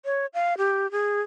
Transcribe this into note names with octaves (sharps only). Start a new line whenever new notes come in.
C#5
F5
G4
G#4